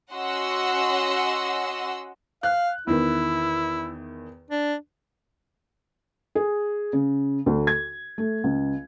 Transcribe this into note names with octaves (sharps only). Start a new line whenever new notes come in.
C#4 F#4 D#5 F#5 C6 E6
F5 F#6
E2 D#3 E4
D4
G#4
C#3
D2
G#6
A3
C#2